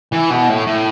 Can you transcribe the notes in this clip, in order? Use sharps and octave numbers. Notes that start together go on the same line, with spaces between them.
E3
B2
A2
A2